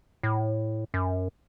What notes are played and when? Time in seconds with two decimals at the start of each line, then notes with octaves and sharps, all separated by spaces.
0.23 A2
0.94 F#2